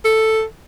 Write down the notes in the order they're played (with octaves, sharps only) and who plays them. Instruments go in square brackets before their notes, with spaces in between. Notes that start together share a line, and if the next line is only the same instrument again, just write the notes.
[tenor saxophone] A4